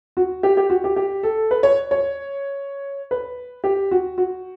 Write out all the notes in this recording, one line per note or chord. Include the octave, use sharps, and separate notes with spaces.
F#4
G4
G4
F#4
G4
G4
A4
B4
C#5
C#5
B4
G4
F#4
F#4